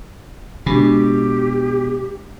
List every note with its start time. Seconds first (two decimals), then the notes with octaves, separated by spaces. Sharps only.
0.66 B2 G#3 D4 G4 B5